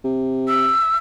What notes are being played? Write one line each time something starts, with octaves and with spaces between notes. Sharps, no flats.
C3
E6